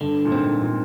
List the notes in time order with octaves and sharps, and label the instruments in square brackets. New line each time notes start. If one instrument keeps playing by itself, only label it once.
[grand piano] G2 [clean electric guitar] D3
[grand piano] A#2
[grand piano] G#2 [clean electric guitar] C4
[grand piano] A#2